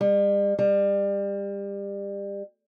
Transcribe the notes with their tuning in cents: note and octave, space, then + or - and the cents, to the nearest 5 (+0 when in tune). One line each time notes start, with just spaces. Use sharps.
G3 +40
G3 +30